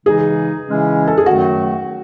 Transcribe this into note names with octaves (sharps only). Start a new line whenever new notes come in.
C#3 E3 G#3 D#4 G#4
C#3 E3 G#3 C#4 E4
A4
G#4
F#2 D#3 F#3 A3 F#4